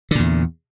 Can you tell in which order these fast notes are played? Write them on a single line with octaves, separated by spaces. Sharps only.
D3 A#2 E2